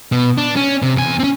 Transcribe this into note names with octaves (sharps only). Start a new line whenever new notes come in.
B2
D4
C#4
C3
E2 G#5
C4 C#4